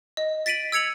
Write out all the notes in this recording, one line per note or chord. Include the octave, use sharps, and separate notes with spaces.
D#5
A6 B6 D7 D#7 F#7
E6 G#6 C#7 F7 F#7